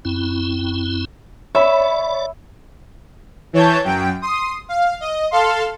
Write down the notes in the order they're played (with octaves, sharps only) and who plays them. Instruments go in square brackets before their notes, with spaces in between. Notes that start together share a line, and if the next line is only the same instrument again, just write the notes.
[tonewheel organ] F#2 C4 E4
[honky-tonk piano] C#5 B5 [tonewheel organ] D5 [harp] E5
[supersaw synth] E3 C#5 A5 G6
F#2 G5
C6 D#6
F5
D#5
A4 F5 C6